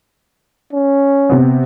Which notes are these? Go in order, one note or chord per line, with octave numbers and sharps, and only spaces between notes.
C#4
C3 B3